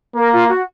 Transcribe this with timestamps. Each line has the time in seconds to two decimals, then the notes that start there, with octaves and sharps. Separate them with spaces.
0.15 A#3 A#4
0.32 F4
0.49 F#4